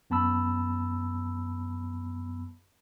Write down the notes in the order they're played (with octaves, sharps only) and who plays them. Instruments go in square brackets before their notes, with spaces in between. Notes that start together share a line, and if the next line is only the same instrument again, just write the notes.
[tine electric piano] F#2 B3 A5 B5 E6